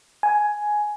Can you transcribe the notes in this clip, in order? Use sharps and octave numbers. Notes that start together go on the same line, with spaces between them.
G#5